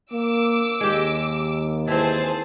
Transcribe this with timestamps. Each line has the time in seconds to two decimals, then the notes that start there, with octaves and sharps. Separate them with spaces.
0.12 A#3 D6 E6
0.81 D#2 G#3 G4
1.88 E3 C4 G#4 C5 A5